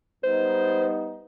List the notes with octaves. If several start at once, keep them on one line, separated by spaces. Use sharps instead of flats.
G3 B3 D#4 C5